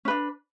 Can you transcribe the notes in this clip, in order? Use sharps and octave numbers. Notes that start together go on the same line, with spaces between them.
C#4 D4 B4